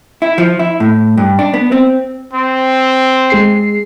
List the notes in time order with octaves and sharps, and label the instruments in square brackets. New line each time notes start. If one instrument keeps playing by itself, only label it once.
[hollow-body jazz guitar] E4
F3
E4
A2
G2
D4
B3
C4
[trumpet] C4
[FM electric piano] G#3 G#4 C7